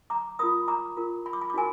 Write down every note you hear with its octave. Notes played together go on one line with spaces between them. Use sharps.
A#5 D6
F4 A#4 B5 D#6
A#5 D6
F4 A#4
B5
D6
B5
D6
D#4 F#4 A#4 G#5